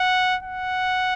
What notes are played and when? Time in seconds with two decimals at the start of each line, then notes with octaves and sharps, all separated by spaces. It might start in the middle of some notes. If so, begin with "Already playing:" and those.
Already playing: F#5
0.43 F#5